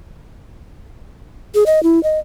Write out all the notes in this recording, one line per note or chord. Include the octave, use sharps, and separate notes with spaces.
G#4
D#5
E4
D#5